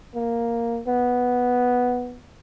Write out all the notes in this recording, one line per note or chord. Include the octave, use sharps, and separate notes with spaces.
A#3
B3